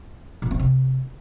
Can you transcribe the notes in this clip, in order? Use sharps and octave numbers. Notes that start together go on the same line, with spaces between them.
A#2
C4
C3